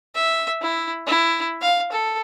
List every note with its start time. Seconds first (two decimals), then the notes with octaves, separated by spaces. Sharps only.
0.15 E5
0.62 E4
1.07 E4
1.61 F5
1.92 A4